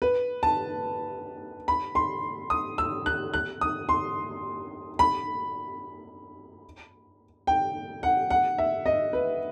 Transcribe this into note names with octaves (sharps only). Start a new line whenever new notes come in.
B4
A5
B5
C6
D#6
E6
F#6
F#6
D#6
C6
B5
G5
F#5
F#5
E5
D#5
B4